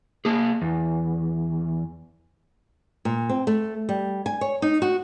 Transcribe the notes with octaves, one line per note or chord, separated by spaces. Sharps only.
A#3 G#4
E2
A#2
C4
A3
G3
G#5
C#5
D#4
F#4